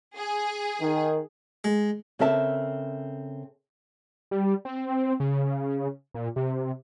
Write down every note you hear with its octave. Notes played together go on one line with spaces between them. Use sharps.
G#4
D#3
G#3
C#3 C4 A4 A#4 E5 A5
G3
C4
C#3
A#2
C3